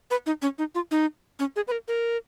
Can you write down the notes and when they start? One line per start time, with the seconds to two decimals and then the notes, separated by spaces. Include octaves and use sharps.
0.11 B4
0.26 D#4
0.42 C#4
0.58 D#4
0.75 F4
0.91 D#4
1.39 C#4
1.56 G#4
1.68 B4
1.72 A#4
1.88 A#4